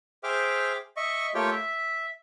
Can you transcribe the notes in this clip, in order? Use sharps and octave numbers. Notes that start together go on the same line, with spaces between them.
G#4 C5 E5 G5 D6 F6
D#5 E5 C#6
A3 A#3 F4 G4 C#5 G5
E5